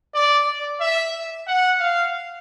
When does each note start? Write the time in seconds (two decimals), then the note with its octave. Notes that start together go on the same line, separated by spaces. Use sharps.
0.14 D5
0.48 D5
0.80 E5
1.47 F#5
1.79 F5